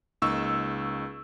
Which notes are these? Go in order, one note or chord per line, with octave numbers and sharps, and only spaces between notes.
C#2 A#3 D#4 C#6 E6